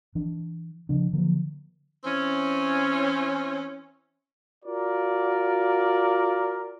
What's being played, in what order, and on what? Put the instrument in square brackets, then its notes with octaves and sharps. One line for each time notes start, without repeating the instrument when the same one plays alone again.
[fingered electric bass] E3 D4
C#3 F3 D4
D3 F3 F#3 A#3
[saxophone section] E3 C4 C#4
[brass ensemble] F4 F#4 A#4 D5